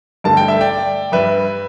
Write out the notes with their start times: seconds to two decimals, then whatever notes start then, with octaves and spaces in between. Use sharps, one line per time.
0.24 G2 D3 A3 A5
0.37 G5
0.48 E5
0.61 D5 G5
1.12 G2 G3 B4 E5